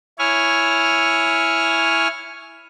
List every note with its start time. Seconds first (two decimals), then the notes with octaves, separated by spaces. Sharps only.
0.19 E4 C#5 G#5 F6